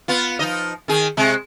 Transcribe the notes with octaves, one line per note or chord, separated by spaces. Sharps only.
B3 F4
F3 D#4 D#5
D#3 G#4
C3 G#3